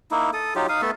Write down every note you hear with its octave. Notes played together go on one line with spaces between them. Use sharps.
A#3 D#4 E4
A4 D#6
F#3 D#4 F4 G4
D#4 F5 D#6
A3 B3 A4 E5